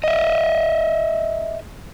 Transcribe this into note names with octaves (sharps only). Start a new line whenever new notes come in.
D#5 E5